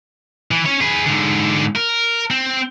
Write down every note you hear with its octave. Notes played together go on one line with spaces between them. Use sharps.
E3
C#4 C#5
G#4 B4
G#2 D3
A#4
C4